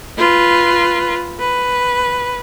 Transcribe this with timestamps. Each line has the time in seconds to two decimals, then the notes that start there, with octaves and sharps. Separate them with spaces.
0.18 F4 B4
1.39 B4